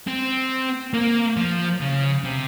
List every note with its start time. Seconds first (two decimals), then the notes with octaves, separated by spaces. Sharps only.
0.07 C4
0.94 A#3
1.37 F3
1.81 C#3
2.24 C3